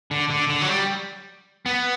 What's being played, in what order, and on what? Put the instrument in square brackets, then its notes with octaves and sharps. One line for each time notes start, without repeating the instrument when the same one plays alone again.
[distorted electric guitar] D3
D3
D3
F#3
G3
B3